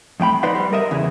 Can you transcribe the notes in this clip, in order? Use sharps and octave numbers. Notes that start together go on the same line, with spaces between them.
F2 A2 G5 B5
D#4 B4 C5 D5 D#5 F#5
G3
A#4 D#5 E5
E2 C#3 E3